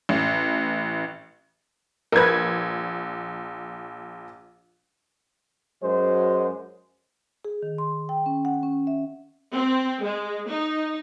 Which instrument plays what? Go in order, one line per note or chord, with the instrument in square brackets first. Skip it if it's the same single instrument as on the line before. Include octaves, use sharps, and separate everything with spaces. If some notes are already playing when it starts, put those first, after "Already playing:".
[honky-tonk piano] A1
[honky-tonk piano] A#1 G#6 [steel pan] A#4 B4
[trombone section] F#2 F#3 G#3 C5
[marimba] G#4
D#3
C6
G5
C#4
F#5
C#4
E5
[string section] C4
G#3
D#4